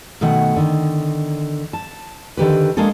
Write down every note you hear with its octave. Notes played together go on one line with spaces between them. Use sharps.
B2 D#3 A3 F#5
D3 D#3
A5
D3 D#3 G4 B4
G#3 A#3 D4 G#4 A4